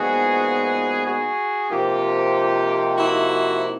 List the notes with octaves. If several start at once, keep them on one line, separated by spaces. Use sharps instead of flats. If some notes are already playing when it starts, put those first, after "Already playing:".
Already playing: A#2 F3 G#3 B3 D#4 F#4 G#4
F#4 G#4
C3 F3 A#3 D#4 F4 G4
E4 F#4